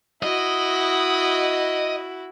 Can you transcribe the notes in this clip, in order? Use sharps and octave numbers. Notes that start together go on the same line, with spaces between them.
E4 F#4 D#5